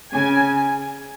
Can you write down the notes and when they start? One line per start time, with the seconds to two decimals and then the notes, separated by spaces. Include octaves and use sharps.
0.13 C#3 G#5